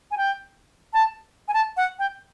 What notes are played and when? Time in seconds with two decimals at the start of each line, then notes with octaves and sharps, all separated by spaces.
0.11 G#5
0.17 G5
0.94 A5
1.48 G#5
1.54 A5
1.77 F#5
1.99 G5